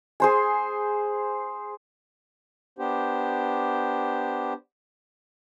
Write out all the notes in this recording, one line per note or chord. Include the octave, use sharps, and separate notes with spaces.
G#4 C5 G#5
B3 D4 G4 C5